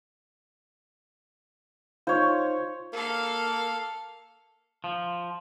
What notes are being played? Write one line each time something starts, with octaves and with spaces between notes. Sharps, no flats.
D#4 F4 C5 C#5 F5
A#3 A4 F5
F3